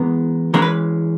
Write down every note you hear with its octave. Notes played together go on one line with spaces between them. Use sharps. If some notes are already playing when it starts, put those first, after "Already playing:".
Already playing: E3 G#3 B3 A#4
E3 G#3 C#4 A#4
B4